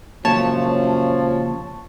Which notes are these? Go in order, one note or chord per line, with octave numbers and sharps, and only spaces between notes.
F#2 A#2 C#3 F3 C#5 A5